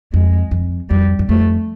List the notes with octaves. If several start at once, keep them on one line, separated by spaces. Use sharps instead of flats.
F2 G#3
F2
F2 G3
F#2
F2 A3